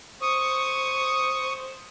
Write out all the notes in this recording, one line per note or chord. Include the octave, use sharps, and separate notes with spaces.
C5 C#6 D#6